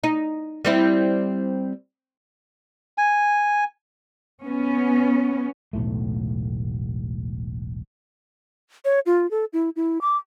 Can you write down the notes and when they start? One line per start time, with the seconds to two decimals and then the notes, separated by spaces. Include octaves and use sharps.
0.04 D#4
0.65 G3 C4 E4
2.98 G#5
4.45 B3 C#4
5.73 E1 B1 A2 A3
8.85 C#5
9.06 F4
9.31 A4
9.53 E4
9.76 E4
10.01 D6